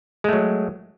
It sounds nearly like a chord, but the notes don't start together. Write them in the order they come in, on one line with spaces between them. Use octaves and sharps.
G#3 A3 F#3